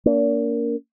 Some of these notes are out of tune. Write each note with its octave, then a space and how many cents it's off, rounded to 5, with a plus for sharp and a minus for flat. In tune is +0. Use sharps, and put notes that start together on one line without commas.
A#3 +0 D4 -40